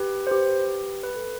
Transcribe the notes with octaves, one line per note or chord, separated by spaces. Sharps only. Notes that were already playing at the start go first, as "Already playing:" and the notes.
Already playing: G4 B4
C5
G4 B4
B4
A4